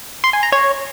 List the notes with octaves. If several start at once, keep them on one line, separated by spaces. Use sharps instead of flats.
C6
G#5
A#5
C#5